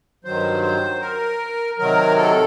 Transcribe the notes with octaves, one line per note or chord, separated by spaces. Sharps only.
G2 D#3 F#3 C5
C5
A#4
C3 D#3 F#3 A#4
A4